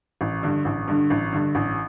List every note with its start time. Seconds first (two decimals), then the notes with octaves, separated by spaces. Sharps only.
0.21 A1
0.43 G2 D3
0.65 A1
0.88 G2 D3
1.10 A1
1.32 G2 D3
1.55 A1